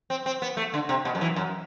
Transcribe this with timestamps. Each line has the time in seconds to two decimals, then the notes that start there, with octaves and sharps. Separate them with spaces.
0.10 C4
0.26 C4
0.42 B3
0.57 A3
0.74 D3
0.89 C3
1.05 B2
1.15 F#2
1.21 E3
1.36 F#2